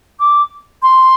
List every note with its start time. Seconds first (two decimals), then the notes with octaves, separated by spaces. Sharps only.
0.20 D6
0.82 C6